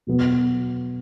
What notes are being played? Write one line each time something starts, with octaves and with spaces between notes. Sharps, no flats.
B2 F#3 B3